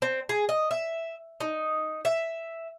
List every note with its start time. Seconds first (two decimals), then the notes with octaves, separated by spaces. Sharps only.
0.02 C4
0.29 G#4
0.49 D#5
0.71 E5
1.40 D#4
2.05 E5